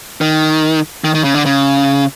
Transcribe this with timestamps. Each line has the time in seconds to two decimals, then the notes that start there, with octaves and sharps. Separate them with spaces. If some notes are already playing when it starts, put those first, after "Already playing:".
0.21 D#3
1.04 D#3
1.15 D#3
1.24 C#3
1.35 D3
1.46 C#3